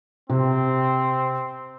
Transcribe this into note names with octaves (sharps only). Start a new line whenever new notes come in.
C3 C4